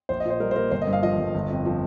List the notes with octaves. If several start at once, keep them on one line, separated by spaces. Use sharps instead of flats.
A#1 C5
D#5
A#2 C5
G3 A#4
C5
A#3 A#4
G1 C5
D#5
G2
F5
F3 D#5
G1
G1
F2
F3